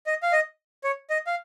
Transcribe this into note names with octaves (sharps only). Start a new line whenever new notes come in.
D#5
F5
D#5
C#5
D#5
F5